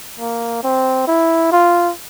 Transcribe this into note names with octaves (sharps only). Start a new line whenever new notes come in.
A#3
C4
E4
F4